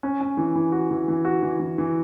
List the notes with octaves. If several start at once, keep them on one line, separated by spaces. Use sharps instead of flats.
C#4
C#4
E3
E3
F#4
E3
E3
F#4
E3
E3
E3